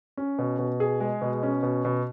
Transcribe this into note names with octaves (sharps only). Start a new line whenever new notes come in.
C#4
B2
B2
G#4
G#3
B2
C#4
B2
B2